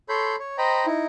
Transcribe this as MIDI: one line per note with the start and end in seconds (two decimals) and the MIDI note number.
0.09 0.36 69
0.09 0.36 73
0.09 0.36 83
0.09 0.36 84
0.09 0.36 91
0.39 0.57 73
0.58 0.86 72
0.58 0.86 75
0.58 0.86 79
0.58 0.86 82
0.58 0.86 83
0.86 1.07 63
0.86 1.07 64